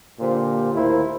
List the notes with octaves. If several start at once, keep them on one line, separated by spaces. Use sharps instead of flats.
A#2 D3 G4 C5
D#2 A2 E4 A#4 C5